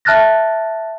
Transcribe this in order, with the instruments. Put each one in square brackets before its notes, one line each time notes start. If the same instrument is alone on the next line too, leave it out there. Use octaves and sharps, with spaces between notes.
[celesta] E5 A5 F6 F#6 A6 A#6